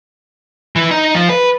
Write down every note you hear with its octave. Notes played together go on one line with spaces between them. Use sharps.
E3
D#4
F3
B4